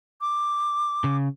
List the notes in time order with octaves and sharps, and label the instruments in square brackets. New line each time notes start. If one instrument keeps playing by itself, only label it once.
[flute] D6
[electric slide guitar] C#3